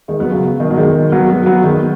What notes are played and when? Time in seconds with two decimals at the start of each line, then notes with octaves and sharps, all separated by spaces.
0.08 D#3 G#3
0.20 F#3 B3
0.32 C#3 F#3
0.60 B2 D#3
0.71 F#3
0.77 D#3 G#3
1.12 F#3 B3
1.29 F#3 B3
1.46 F#3 B3
1.64 D#3 G#3